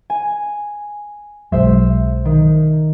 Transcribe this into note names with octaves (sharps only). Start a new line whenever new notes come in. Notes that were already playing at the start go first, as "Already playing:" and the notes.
G#5
B1 F#3 G#3 C5 E5
D#3